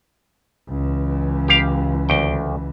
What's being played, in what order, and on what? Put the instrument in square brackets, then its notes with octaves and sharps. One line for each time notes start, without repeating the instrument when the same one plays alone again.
[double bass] C#2 E3
[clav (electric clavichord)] G4 F5
D2 G5